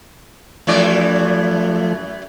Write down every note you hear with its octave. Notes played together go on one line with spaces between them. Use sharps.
F#2 E3 F3 A3 D5